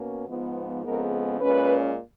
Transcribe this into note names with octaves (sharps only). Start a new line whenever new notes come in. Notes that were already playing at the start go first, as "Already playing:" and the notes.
Already playing: B2 A#3 C#4
G#2 F3 B3
F2 C#3 G#3 B3 A#4
A#2 G#3 C#4 B4